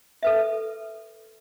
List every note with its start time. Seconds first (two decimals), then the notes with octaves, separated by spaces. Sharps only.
0.23 A4 B4 E5